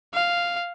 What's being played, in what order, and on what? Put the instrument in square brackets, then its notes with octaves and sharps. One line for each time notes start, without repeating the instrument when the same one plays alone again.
[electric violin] F5